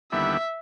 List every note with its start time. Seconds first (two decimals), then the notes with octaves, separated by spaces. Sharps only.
0.12 D#2 D3 G3 B3 E4 E5